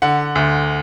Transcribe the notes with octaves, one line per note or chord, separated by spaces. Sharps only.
D3 F#5
D2